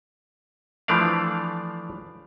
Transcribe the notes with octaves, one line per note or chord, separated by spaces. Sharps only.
E3 F3 A3 D4 D5 F5